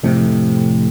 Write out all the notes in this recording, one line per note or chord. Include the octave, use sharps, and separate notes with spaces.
F2 A2 C3